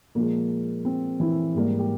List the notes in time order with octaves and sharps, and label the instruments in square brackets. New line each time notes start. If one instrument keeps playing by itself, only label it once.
[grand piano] A#2 F3 G#3 A#3
C4
E3 E4
G#2 G3 A#3
G4